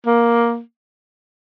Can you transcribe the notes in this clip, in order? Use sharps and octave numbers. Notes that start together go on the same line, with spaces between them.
A#3